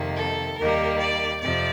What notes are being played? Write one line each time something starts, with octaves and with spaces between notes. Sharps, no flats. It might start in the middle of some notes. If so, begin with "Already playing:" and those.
Already playing: F2 C3 D#3 A#3
A4
D#2 D#3 G3 A#3 A#4
D5
F2 C3 F3 D5